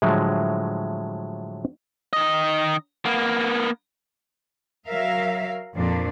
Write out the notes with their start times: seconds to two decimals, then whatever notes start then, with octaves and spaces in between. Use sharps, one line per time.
0.02 A2 D3 F3 F#3 G#3
2.13 D#3 D#5
3.05 A#3 B3
4.88 F#3 A#4 E5 F5
5.75 F2 A#2 D4